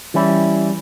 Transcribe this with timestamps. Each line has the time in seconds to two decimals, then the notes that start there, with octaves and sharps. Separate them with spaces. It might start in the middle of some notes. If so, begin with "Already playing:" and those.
0.14 E3 G3 C#4 E4